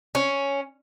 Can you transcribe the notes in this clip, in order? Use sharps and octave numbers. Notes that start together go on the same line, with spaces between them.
C#4